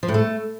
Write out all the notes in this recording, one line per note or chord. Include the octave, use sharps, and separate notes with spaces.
F3
A2
A3